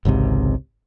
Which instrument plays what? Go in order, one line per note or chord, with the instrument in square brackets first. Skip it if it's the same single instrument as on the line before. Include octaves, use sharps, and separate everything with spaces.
[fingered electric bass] G#1 C#2 G#2 C3